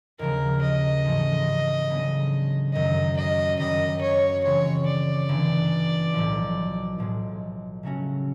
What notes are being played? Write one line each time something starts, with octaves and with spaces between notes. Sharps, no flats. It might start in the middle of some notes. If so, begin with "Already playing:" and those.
D#2 C#3 F3 A#4
D#5
A1 G#2 F3 A3
D2 C#3 F#3 B3
F#2 D#3 F#3 D#5
D#5
F#2 D#3 G3 D#5
C#5
C#3 E3 G#3 C4 F4 C#5
D5
G1 G2 E3
B1 A2 F3
B1 A2 F3 G#3
C#3 F#3 A3 C#4 F#4